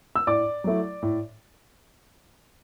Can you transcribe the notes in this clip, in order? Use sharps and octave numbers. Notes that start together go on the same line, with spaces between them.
E6
A2 D5 D6
F#3 A3 E4
A2